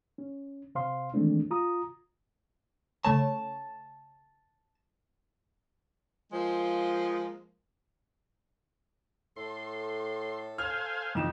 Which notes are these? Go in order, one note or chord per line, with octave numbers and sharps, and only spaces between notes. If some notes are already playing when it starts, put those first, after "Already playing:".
C#4
C3 C5 F5 C6
D#3 E3 G#3 A3 C4 D4
F4 A#5 D#6
C#3 A3 C#5 A5
F3 G#3 A#3 C5
A2 A4 C6
C5 F5 G#5 F6
F2 E3 D#4 G4 E7